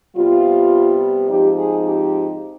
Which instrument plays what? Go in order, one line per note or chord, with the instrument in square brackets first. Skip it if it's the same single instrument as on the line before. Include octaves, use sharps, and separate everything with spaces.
[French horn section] C3 G3 B3 F4
G#2 F3 C4 D#4 G4
G#4
G4